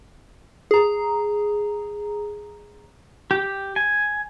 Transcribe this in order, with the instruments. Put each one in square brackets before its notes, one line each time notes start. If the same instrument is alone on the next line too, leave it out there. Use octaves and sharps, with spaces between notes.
[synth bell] G#4 A#5
[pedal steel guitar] G4
G#5